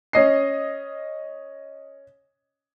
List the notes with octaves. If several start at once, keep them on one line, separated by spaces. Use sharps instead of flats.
C#4 D#5 C7